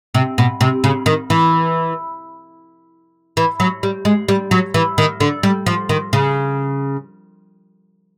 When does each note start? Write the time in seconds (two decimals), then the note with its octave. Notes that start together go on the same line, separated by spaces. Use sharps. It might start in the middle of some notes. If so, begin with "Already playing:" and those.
0.15 C3
0.38 B2
0.61 C3
0.84 C#3
1.06 D#3
1.30 E3
3.37 E3
3.60 F#3
3.83 G3
4.05 G#3
4.28 G3
4.51 F#3
4.74 E3
4.98 D#3
5.20 D3
5.43 G3
5.66 F3
5.89 D#3
6.13 C#3